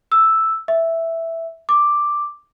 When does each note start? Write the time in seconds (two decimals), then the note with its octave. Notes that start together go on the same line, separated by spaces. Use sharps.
0.12 E6
0.68 E5
1.69 D6